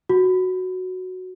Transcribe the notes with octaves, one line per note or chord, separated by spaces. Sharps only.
F#4